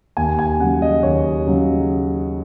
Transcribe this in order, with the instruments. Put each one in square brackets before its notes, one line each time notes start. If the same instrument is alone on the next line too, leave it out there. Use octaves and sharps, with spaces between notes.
[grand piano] D#2 G#5
G#5
C#3 F#3 F#5
D#5
D#2 C#5
C#3 F#3